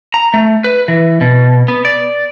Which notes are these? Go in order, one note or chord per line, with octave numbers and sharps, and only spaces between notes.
A#5
A3
B4
E3
B2
B3
D5